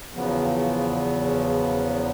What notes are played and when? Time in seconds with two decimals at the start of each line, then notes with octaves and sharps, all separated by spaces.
0.15 E2 C#3 F3 F#3 B3